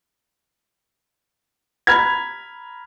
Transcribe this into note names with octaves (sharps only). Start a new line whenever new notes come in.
A#5 B5 F6 G#6